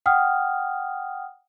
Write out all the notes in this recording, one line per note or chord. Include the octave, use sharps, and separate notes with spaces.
F#5 G5 D#6 F6